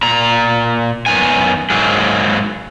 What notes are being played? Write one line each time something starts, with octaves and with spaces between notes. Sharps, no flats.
A#2 A#5
F#2 D#3 B3 G#5
G#2 F#3 A#3 G#4